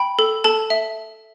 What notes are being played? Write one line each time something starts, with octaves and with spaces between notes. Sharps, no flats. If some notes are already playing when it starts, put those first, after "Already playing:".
Already playing: G5 B5
A4
A4 A5
E5